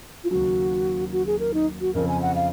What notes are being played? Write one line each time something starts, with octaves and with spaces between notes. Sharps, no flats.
F4
D#2 C#3 F#3 F#4
F#4
G#4
A#4
D#4
F#4
F2 C#3 F3 C4 A#4
G#5
F#5
F5